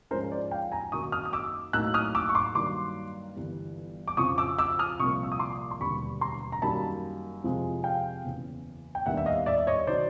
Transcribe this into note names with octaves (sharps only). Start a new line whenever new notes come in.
G#2 F3 G#3 C#4 A#4 C5
C5 D5
F5 G5
G#5 A#5
F#2 D#3 F#3 A#3 D#4 C#6 D#6
D#6 F6
D#6
D6 E6
A2 F#3 A#3 D#4 E6 F#6
D#6 F6
D6 E6
C#6
C6 D6
G2 D#3 F#3 A#3 C6 D6
G1 G2 E3 G3
D6
F2 C#3 F3 C#6 D#6
D6 E6
D6 E6
D#6 F6
C2 A#2 F3 A#3 C#6 D#6
E6
D#6
C6 D6
C6
E1 D#2 D3 G3 B5 C#6
A#5 C6
A#5
F#2 D#3 G3 A#3 A5 B5
F2 C3 F3 G#3
F5 G5
F#1 E2 C#3
G5
D#2 D#3 G3 B3 D4 E5 F#5
E5
D#5 F5
D5 E5
C#5 D#5
D#3 F#3 C5 D5